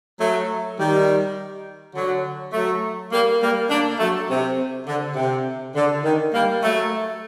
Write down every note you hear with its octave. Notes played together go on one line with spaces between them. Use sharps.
F#3 A3
D#3 G3
D3 F#3
F#3 A3
G3 A#3
G3 A#3
A#3 D4
F#3 A3
C3
D3
C3
D3
D#3
G3 A#3
F#3 A3